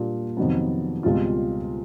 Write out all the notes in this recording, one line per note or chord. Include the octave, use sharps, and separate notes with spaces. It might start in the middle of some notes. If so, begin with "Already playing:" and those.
Already playing: A#2 G3 A#3 D4 F4
F2 C3 D#3 F#3 B3
C#2 B2 G3 C4 F4